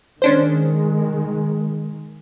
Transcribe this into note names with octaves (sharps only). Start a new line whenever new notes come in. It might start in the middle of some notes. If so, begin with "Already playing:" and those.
D#3 G#3 C#4 D4 C5